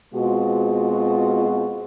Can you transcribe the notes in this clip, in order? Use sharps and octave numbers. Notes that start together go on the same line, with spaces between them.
B2 G#3 C4 F4 F#4